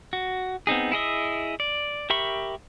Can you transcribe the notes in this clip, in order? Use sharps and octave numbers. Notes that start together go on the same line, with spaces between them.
F#4
B3 C4 D#4 G#4
E4 G#4 D#5 E5
D5
G4 A#4 E5 B5 C#6